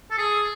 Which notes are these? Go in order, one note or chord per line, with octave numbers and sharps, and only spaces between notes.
A4
G#4